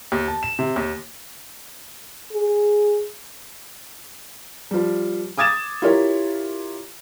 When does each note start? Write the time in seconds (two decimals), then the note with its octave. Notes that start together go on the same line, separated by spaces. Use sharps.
0.12 D#2
0.28 A5
0.43 E7
0.59 C3
0.76 D#2
2.32 G#4
4.71 F3 G3
5.38 D6 D#6 G#6 A6 E7
5.82 E4 F4 G4 A#4 C#5